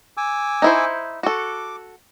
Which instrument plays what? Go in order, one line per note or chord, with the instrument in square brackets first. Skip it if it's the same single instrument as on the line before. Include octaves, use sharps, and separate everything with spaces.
[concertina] G#5 D6 E6
[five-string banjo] D#4 E4 C5
[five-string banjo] F#4 A4 [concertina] D6